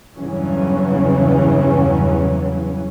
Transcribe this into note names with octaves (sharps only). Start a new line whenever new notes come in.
E2 G2 C#3 E3 F#3 C#4